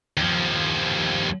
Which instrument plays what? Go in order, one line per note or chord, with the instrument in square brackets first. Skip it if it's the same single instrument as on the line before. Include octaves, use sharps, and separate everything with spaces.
[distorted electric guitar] D#2 F3